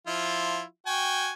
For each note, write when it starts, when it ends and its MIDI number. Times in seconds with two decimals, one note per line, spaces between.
0.07 0.63 53
0.07 0.63 64
0.07 0.63 65
0.86 1.32 66
0.86 1.32 79
0.86 1.32 80